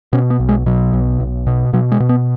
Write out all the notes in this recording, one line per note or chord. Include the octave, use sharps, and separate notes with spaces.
B2 C#4
B3
B1
G#3
B2 F#3
B1
B1
B2
B2 F#3
G#3
B2
B3